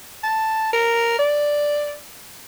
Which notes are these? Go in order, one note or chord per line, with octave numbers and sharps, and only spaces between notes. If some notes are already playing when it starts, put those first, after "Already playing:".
A5
A#4
D5